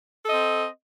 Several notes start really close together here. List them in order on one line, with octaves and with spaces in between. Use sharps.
A4 D#5 C4